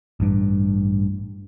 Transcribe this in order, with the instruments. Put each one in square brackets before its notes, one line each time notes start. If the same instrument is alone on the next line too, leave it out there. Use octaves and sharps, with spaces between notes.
[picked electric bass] A1 G2